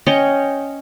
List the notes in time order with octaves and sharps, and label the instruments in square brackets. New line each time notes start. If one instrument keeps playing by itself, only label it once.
[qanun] C#4 C#5 D#5 G5